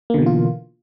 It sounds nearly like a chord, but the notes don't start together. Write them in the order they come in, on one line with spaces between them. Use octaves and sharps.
A#3 D3 B2 E3 F4